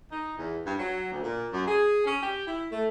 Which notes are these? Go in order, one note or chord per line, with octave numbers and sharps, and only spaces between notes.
D#4
E2
G2
F#3
D2
A#2
F#2
G#4
C#4
G4
E4
A3